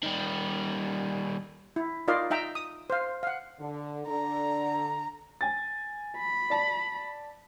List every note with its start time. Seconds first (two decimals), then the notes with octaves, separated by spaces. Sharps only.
0.03 D#3 G3
1.76 E4
2.08 D#4 F4 A#4 D5 D#5 F5
2.30 D#4 E5 G5 A#5
2.55 D#6
2.90 C5 F5
3.23 F5 F#5
3.60 D3
4.06 D3 A#5
5.41 G#5 A6
6.18 B5
6.50 D5 A5